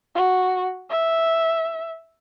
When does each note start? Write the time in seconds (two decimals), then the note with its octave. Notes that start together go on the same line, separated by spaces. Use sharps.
0.15 F#4
0.90 E5